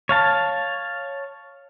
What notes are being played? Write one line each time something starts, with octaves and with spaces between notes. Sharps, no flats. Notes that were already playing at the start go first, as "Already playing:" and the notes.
C#5 F5 A5